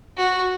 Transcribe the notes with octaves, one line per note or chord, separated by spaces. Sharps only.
F#4